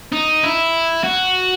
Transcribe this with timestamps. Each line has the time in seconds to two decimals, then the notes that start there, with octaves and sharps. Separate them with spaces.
0.13 D#4
0.44 E4
1.04 F#4